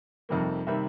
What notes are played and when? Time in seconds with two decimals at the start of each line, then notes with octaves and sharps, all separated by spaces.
0.29 F2 C3 D#3 G3 A#3
0.67 C3 D#3 G3 A#3 E5